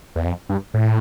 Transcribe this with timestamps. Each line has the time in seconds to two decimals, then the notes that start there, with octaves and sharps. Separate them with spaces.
0.16 E2
0.25 F2
0.49 G2
0.74 A2